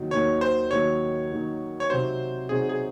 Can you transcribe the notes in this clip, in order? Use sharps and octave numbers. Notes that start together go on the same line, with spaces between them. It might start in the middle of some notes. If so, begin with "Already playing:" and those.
Already playing: D#2 D#3 F#3
D#2 D#3 F#3 C#5
C5
D#2 D#3 F#3 C#5
D#2 D#3 F#3
C#5
C3 F#3 C4 D#4 F#4 C5
C3 F#3 C4 D#4 F#4 G#4
G#4